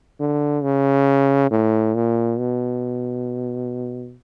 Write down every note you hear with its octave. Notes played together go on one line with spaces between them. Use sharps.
D3
C#3
A2
A#2
B2